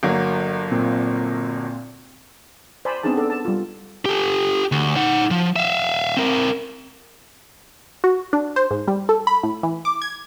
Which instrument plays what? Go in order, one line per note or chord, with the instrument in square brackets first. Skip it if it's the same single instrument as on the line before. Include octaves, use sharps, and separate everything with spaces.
[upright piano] G1 F#3 A#3
[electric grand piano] A#2 C4
[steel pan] C5 D5 G#5 A5 B5
B3 C4 D4 D#4 G#4 A5
A4 D5
A5
G3 F4
[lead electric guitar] G4 A4
D2
D#4 F#5
F3
E5 F5
C4 A#4
[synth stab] F#4
D4
C5
G#2
G3
A4
B5
A2
E3
D6
G#6